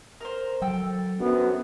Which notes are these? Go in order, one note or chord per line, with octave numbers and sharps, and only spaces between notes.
A#4 C5
F#3 A4 G5 E6
F#2 B3 D4 F#4 C5